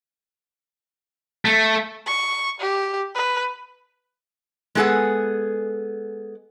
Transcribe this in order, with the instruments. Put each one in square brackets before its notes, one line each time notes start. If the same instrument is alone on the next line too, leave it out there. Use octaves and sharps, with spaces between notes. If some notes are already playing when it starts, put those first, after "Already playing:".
[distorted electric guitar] A3
[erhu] C#6
G4
B4
[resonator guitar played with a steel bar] G#3 B3 G#4 A4 B4 F#5